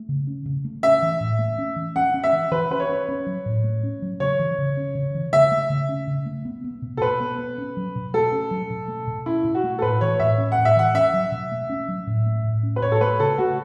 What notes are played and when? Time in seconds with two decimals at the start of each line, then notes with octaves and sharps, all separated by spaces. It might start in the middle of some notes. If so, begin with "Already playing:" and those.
Already playing: A3
0.09 C#3
0.27 C#4
0.46 C#3
0.65 A3
0.83 C#4 E5
1.02 E3
1.20 A2
1.39 A3
1.58 C#4
1.76 E3
1.96 C#4 F#5
2.14 C#4
2.24 E5
2.32 E3
2.52 E3 B4
2.71 C#4 B4
2.80 C#5
2.89 C#4
3.09 C#4
3.26 F#3
3.46 A2
3.64 A3
3.83 C#4
4.02 F#3
4.20 C#3 C#5
4.39 E3
4.58 C#3
4.77 C#4
4.95 C#3
5.14 E3
5.33 C#3 E5
5.52 A3
5.70 C#3
5.89 C#4
6.07 C#3
6.26 A3
6.45 B3
6.64 B3
6.82 B2
6.97 A4
7.01 B2 B4
7.20 B3
7.39 B3
7.58 C#4
7.77 F#3
7.96 B2
8.14 A3 A4
8.32 C#4
8.51 F#3
8.70 B2
8.88 A3
9.07 B2
9.26 C#4 E4
9.44 B2
9.55 F#4
9.64 A3
9.78 A4
9.82 A2 B4
10.01 E3 C#5
10.20 A2 E5
10.38 C#4
10.52 F#5
10.58 A2
10.65 E5
10.76 E3 F#5
10.95 C#4 E5
11.14 F#3
11.32 B2
11.52 A3
11.70 C#4
11.88 F#3
12.07 A2
12.26 A3
12.44 A2
12.63 C#4
12.76 B4
12.82 A2 C#5
12.92 A4
13.01 A3 B4
13.19 C#3 A4
13.38 A3 F#4